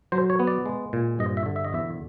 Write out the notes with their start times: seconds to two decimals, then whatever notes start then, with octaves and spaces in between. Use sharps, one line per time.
0.12 F#3 C5
0.30 C#5
0.39 B3
0.47 D5
0.66 G#3
0.93 A#2
1.19 G2 D#5
1.37 E5
1.46 D3
1.56 E5
1.65 D#5
1.73 E2 E5